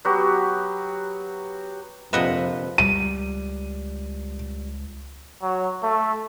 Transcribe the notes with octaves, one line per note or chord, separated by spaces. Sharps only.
F#3 B3 F#4 G4
A#1 F2 C3 F3 B4 D#5 E5 F#5
C#2 G3 D#7
F#3
A3